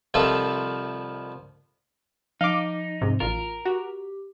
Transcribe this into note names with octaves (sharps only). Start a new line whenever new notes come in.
C2 D#3 F3 F4 A4 E5
F3 D#4 F5 D6
G#2 C3
A1 F4 A#4
F#4 G4